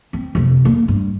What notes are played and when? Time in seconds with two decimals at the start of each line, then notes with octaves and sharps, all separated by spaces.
0.13 C4
0.35 F2 C3
0.65 A#3
0.88 G2